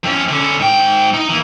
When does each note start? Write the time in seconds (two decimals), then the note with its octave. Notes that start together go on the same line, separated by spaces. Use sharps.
0.04 F2 C#4
0.29 D3 C#4
0.59 G#2 G5
1.14 D#4
1.29 E3 A#3